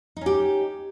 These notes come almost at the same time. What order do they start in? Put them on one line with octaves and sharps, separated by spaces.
D#4 C#4 G4